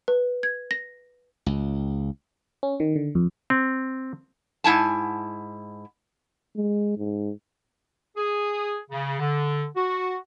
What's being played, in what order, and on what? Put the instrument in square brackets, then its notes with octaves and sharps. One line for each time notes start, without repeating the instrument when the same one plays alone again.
[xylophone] B4
G#6
A#6
[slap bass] C#2
[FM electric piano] C#4
D#3
D3
F2
[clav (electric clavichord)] C4
[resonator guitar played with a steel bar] G#2 E4 G#5 A5
[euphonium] G#3
G#2
[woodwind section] G#4
C#3
D3
F#4